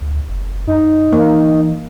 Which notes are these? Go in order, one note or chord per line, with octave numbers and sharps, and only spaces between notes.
D2
F#1
F#2 D#4
E3 A#3